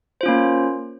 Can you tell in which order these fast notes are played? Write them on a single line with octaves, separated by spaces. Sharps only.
C5 F4 C#4 A#3